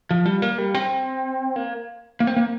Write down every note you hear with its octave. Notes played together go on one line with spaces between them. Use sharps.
F3
G3
A#3
G3
C4
A#3
A#3
C4
A#3